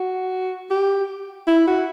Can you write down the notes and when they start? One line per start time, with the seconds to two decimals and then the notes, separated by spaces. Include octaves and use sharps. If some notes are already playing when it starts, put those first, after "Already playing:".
Already playing: F#4
0.70 G4
1.47 E4
1.67 F#4